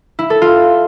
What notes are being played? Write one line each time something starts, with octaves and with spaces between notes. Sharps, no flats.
E4
A4
F4